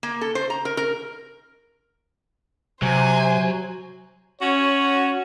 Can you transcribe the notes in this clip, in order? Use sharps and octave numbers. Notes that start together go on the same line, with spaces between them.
A#3
A4
C5
A#5
A#4
A#4
C3 F#3 C5 G#5
C#4 F#4 C#5